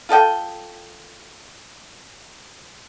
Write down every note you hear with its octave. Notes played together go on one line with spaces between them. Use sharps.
F4 A4 D#5 G5